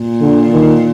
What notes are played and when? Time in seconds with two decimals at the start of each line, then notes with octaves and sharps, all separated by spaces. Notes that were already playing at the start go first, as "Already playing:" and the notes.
Already playing: A#2
0.21 D3
0.53 D#3